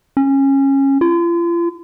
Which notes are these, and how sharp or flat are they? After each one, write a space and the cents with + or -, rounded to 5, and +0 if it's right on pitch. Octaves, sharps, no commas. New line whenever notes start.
C#4 -20
F4 -40